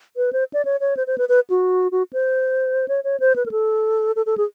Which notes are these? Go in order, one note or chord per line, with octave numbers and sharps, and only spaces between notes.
B4
C5
D5
C#5
C#5
C5
C5
B4
B4
F#4
F#4
C5
C#5
C#5
C5
B4
A#4
A4
A4
A4
G#4